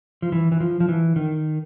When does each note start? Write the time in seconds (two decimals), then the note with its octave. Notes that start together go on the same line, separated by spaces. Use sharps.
0.22 F3
0.32 E3
0.52 E3
0.61 F3
0.80 F3
0.89 E3
1.16 D#3